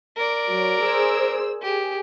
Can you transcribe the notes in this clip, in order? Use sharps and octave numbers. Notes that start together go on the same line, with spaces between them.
A#4 D5
F#3
G#4 C5 E6
G4 G#4